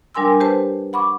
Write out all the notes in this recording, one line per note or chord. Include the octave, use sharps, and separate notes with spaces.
G3 D4 A#4 G#5 C6 E6
G4 B4 C5 A5
F#5 B5 C#6 D6